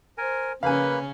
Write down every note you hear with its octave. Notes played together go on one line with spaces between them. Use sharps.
A#4 C5 G#5
C#3 A#3 C#4 B4 F5 G#5 B5